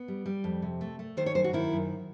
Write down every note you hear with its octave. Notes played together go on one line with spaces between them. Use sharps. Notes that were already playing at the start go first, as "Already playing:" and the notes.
Already playing: B3
G3
G3
F2
C3
A3
A3
D#3 C5
C#5
F#2 C5
F#4
D#3 E4
F#2